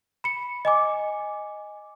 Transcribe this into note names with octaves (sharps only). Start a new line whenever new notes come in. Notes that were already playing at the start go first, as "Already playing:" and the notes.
B5 C#7
D#5 G#5 D6